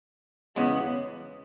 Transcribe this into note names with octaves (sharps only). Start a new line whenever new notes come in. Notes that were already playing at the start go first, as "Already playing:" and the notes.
E2 C#3 G#3 B3